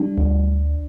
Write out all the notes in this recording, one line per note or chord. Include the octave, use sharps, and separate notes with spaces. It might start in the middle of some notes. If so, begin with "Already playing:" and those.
Already playing: G3 D4
D2